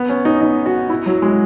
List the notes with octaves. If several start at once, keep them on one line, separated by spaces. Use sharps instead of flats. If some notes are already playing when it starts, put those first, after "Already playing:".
Already playing: B3
C#4
D#4
D#4
F#4
E4
F#3
G#3